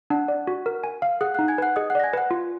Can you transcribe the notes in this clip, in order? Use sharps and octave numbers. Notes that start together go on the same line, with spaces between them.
D4 F#5 F#6
D5
F#4
A#4
G#5
F5
G#4 F#5 F#6
D#4 F#5 F#6
G#5 G#6
B4 F#5 F#6
G#4 D#5 D#6
F#5 F#6
D5 A#6
G#5 G#6
B4 F#5 F#6
F4